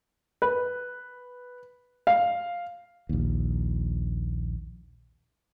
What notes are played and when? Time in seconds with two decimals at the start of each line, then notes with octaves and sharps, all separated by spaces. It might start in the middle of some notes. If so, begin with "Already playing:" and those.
0.42 B4
2.07 F5
3.09 A#1 D#2